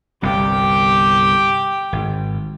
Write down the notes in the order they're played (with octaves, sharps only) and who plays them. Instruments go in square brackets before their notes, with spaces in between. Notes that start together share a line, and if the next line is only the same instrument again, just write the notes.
[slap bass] G1 C2 C3 [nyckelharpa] G4 G5
[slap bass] G#1